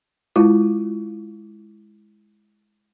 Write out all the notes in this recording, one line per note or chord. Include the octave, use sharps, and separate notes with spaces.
G#3 E4 F4